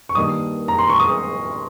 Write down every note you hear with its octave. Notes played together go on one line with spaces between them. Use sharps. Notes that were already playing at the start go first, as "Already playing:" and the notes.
C#6
G2 D#3 A#3 D#6
A#5
C6
C#6
D#6